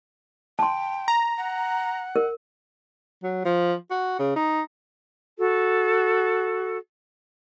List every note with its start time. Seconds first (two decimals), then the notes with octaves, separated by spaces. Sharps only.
0.59 G5 A5 C6
1.08 A#5
1.38 F#5
2.16 A#4
3.23 F#3
3.45 F3
3.91 F#4
4.19 C#3
4.36 D#4
5.37 F#4 A4